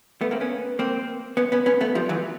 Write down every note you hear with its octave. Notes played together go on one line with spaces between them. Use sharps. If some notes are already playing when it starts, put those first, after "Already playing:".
A3 B3
A#3 C4
B3 C#4
A#3 C4
B3 C#4
B3 C#4
B3 C#4
A3 B3
F3 G3
E3 F#3